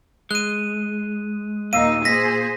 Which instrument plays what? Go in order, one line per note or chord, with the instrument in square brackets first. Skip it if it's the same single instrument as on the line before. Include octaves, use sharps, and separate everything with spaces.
[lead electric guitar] G#3 [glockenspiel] F#6 D#7
[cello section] D#2 D#4 [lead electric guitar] A#2 [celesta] F5 E6 C7 [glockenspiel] D#7
[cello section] G#4 C5 [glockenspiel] A#6 B6